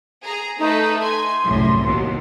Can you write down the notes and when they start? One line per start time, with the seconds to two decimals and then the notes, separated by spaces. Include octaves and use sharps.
0.24 G#4 A#5
0.59 A3 D#4 B4
1.02 G#5 C6
1.44 C2 F#2 A2
1.81 A1 D#2 B2